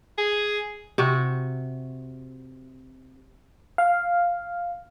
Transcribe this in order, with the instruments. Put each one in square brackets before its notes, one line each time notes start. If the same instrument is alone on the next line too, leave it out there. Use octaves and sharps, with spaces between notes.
[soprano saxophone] G#4
[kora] C3 F#4
[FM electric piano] F5